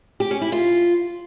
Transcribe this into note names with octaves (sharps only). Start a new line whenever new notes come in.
G4
C#4
E4
F4